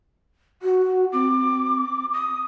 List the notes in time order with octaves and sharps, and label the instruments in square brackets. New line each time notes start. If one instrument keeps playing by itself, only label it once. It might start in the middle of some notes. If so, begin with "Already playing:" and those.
[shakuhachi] F#4
[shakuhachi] C4 [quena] D6
[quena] D#6